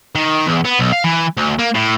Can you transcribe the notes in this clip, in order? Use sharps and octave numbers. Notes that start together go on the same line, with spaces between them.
D#3
E2
B3
B1
F5
E3
D2
A#3
A2